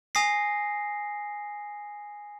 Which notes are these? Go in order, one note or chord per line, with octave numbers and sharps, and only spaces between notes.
G#5 D#6 A#6 C7